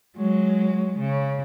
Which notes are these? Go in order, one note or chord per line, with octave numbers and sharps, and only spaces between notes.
F#3 G#3
C#3